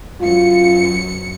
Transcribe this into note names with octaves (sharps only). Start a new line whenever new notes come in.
F#2 F4 C#7